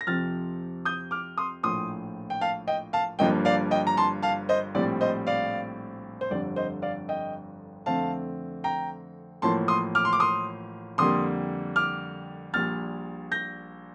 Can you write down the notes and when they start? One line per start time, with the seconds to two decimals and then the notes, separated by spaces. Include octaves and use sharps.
0.01 A#6
0.07 F2 C3 F3 C4 F6 A6
0.85 D#6 G6
1.11 D6 F6
1.38 C6 D#6
1.63 A#1 A2 F3 C6 D#6
2.30 G5
2.41 F5 A5
2.67 D#5 G5
2.93 F5 A5
3.19 G1 G2 F3 A#3 D#5 G5
3.45 D5 F5
3.71 D#5 G5
3.87 A#5
3.97 A5 C6
4.22 F5 A5
4.49 C5 D#5
4.75 A#1 A2 G3 C4 D5
5.01 C5 D#5
5.27 D5 F5
6.21 C5
6.31 G1 F2 D3 G3 C4 D5
6.56 C5 D#5
6.82 D5 F5
7.09 D#5 G5
7.86 F2 D3 A3 C4 F5 A5
8.64 G5 A#5
9.42 A1 A2 F3 A#3 A5 C6
9.68 C6 D#6
9.95 D6 F6
10.05 C6
10.13 D6
10.20 C6 D#6
10.98 F2 D3 G3 A#3 C6 D#6
11.76 D6 F6
12.54 A#1 A#2 G3 F6 A6
13.32 G6 A#6